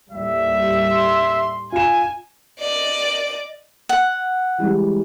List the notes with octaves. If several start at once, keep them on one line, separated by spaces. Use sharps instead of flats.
D#2 A2 G3 E5
C6
F4 G#5 E7
D5 D#5
F#5
E3 G3 G#3